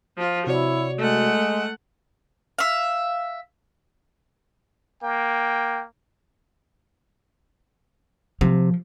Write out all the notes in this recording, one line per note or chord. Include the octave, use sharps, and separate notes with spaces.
F3 F4
C3 E4 F#4 C#5 D5
G#3 A3 F#5
E5 F5
A#3 G5
C3 F3